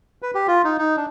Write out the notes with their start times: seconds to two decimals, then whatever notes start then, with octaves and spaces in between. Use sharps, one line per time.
0.22 B4
0.35 G4
0.48 F4
0.64 D#4
0.78 D#4
0.97 D4